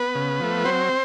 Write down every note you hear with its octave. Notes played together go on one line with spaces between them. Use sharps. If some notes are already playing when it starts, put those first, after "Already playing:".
Already playing: B3 B4
C#3
F3 A3
F#3 C4 C5